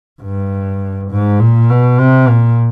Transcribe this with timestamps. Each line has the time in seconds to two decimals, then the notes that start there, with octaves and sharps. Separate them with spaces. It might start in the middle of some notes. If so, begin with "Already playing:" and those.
0.22 G2
1.10 G#2
1.39 A#2
1.69 B2
1.99 C3
2.28 A#2